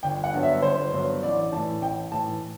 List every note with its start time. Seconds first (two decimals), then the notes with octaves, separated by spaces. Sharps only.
0.03 G1 G5
0.24 F#5
0.34 G2 D3 F#3 B3
0.43 E5
0.62 G1 C5
0.93 G2 D3 F#3 B3
1.23 A1 D5
1.52 A2 E3 A5
1.82 A1 G5
2.11 A2 E3 A5